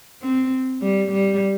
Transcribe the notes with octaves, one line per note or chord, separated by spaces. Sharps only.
C4
G3
G3